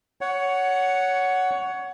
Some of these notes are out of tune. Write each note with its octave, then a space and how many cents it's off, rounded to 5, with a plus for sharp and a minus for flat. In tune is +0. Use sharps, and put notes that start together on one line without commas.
C#5 +15 F#5 +0